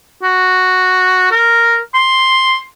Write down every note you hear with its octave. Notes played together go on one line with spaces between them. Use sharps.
F#4
A#4
C6